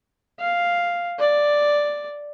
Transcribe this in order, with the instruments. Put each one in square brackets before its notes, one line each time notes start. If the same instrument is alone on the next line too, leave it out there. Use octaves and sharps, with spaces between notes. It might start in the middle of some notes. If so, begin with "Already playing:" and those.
[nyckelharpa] F5
D5